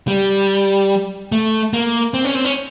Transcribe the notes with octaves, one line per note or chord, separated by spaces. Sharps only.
G3
A3
A#3
C4
C#4
C4
C#4